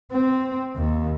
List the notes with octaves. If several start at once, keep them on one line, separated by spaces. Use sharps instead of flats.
C4
D#2